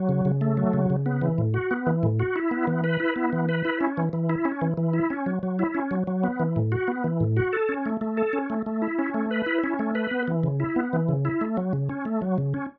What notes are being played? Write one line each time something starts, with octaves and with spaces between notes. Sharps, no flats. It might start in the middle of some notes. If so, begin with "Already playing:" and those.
Already playing: F#3
C#3
C#3
A3
F#3
C#3
C#3
B3
E3
A2
F#4
B3
E3
A2
F#4
E4
B3
E3
B4
E4
B3
E3
B4
E4
C#4
E3
E3
E4
C#4
E3
E3
E4
C#4
F#3
F#3
E4
C#4
F#3
F#3
B3
E3
A2
F#4
B3
E3
A2
F#4
A4
C#4
A3
A3
A4
C#4
A3
A3
E4
C#4
A3
B4
E4
C#4
A3
B4
B3
E3
C#3
E4
B3
E3
C#3
E4
A3
F#3
C#3
C#4
A3
F#3
C#3
C#4